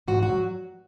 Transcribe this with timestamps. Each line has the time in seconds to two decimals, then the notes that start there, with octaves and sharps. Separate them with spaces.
0.08 G#2 F#4
0.23 F#4
0.29 F#3